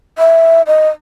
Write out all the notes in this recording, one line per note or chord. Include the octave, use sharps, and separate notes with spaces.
E5
D#5